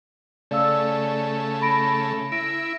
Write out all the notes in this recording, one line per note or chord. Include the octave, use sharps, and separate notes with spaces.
C#3 A3 D5 F5 E6
B5 A#6 D7
E4 A#6 D7